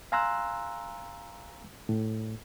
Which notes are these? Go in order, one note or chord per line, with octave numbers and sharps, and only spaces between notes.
F5 G#5 A#5 C6 E6 F#6
A2